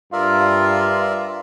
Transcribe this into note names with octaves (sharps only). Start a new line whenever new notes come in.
G2 F4 A#4 D5 E5